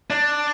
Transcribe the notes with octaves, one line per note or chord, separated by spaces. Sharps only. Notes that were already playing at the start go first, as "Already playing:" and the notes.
D4